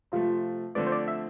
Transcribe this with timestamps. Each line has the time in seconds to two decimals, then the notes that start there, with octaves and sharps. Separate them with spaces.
0.12 C3 F3 A3 F4
0.75 D3 F3 A3 C4 D5
0.87 C5
0.92 D5
1.08 E5